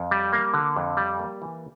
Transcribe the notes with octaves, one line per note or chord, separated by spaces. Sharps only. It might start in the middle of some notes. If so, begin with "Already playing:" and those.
Already playing: F2
G3
A#3
D3
F2
G3
A#3
E3